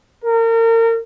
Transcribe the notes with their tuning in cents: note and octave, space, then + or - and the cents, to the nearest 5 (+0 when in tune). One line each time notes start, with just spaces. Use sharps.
A#4 -35